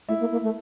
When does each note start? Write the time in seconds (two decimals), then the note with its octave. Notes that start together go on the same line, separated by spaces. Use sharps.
0.08 A3 E4 E5
0.20 A#3
0.32 A#3
0.43 A3